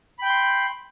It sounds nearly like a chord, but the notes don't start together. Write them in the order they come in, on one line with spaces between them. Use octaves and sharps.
B5 G5 G6 C6